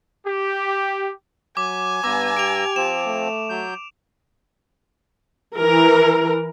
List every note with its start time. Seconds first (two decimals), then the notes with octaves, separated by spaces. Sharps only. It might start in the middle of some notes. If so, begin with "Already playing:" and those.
0.25 G4
1.57 F#3 G#5 D6
2.04 G2 B3 A#5 D6 E6
2.37 G4 D7 F7
2.76 F3 C4 E7
3.06 A3
3.50 F#3 G6
5.57 E3 A#4